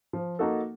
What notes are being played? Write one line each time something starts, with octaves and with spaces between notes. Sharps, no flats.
F3
A#3 D#4 F#4 A4